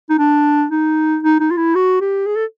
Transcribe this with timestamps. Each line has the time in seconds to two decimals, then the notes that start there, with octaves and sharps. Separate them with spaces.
0.10 D#4
0.19 D4
0.71 D#4
1.23 D#4
1.40 D#4
1.51 F4
1.57 E4
1.75 F#4
2.01 G4
2.26 G#4
2.36 A4